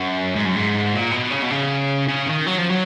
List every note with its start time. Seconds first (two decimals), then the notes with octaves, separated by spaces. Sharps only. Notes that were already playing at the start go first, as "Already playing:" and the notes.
Already playing: F#2
0.35 G#2
0.45 F#2
0.55 G#2
0.93 A#2
1.11 B2
1.31 C#3
1.42 B2
1.50 C#3
2.08 C#3
2.27 D#3
2.46 F#3
2.58 F3
2.69 F#3